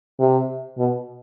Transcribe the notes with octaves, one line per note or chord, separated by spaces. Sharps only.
C3
B2